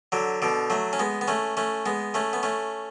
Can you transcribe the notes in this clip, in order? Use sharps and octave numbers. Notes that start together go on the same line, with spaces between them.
D3 F#3
B2 D3
F#3 A3
C#4
G#3 B3
B3
A3 C#4
A3 C#4
G#3 B3
A3 C#4
B3
A3 C#4